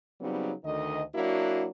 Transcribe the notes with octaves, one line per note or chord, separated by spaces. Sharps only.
C#3 F#3 G3 B3 C4 D#4
D2 D#3 D#5
F#3 A#3 D4 E4 F#4